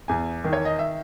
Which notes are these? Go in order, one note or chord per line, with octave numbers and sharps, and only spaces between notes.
E2 G#5
D#3
C#5
D#5
E5